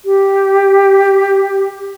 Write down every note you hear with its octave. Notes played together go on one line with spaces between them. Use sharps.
G4